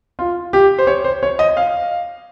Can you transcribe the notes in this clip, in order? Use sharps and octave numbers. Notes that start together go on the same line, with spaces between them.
F4
G4
C5
C#5
C5
C#5
D#5
F5